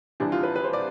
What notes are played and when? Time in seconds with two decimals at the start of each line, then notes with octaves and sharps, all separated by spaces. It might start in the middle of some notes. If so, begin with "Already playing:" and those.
0.20 C2 C3 E3 D4
0.32 F4
0.43 B4
0.56 B4
0.64 C5
0.73 D5